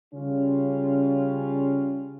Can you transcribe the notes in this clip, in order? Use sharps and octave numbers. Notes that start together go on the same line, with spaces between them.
C#3 G3 C#4 F4